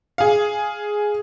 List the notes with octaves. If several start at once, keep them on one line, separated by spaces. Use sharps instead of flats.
G#4 F5